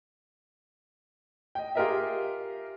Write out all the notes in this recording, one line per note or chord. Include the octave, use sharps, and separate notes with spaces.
D#5 G5
F4 G4 G#4 A#4 D#5 E5